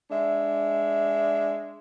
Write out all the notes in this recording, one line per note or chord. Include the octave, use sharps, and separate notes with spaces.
G#3 D4 E5